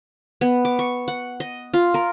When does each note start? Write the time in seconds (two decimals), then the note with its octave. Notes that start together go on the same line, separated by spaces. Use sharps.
0.41 B3
0.65 D6
0.79 C#6
1.08 F#5
1.40 D#5
1.74 F4
1.94 A#4